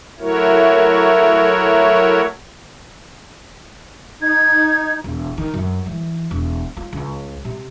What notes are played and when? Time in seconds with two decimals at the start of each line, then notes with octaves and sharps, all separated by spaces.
0.19 F#3 A3 E4 F#4 A#4 C#5
4.22 D#4 G#6
5.04 E1
5.38 D#3
5.54 F#2
5.86 E3
6.31 E1
6.77 F4
6.93 C#2
7.45 C3